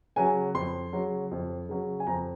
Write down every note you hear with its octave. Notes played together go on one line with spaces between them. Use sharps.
C#3 F#3 G#5
F2 C6
C#3 F#3
F2
C#3 F#3
G#5
F2 A#5